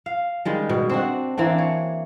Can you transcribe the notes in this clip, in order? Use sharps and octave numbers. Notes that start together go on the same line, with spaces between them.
F5
D#3 G3 G#3
B2
C4 D4 F#4
E3 A#3 C4 D4
C#5